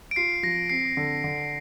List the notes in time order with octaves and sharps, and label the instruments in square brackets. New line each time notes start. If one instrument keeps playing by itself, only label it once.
[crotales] D7
[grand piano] F4 [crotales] C7
[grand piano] F3 [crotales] A#6
[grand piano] C4 [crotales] C7
[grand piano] D3
D3